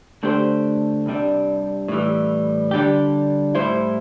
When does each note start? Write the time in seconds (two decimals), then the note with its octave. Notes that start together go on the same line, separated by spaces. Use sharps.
0.23 D3 A3 D4 G4 C5
1.06 C2 C3 G3 D4
1.88 A2 E3 G3
2.71 D3 G3 D4 G4
3.55 A2 G3 E4 C5